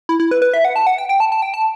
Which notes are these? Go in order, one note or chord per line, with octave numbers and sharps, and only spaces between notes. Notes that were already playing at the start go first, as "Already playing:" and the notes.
E4
E4
B4
B4
E5
F#5
A5
F#5
G5
G5
A5
A5
G5
A5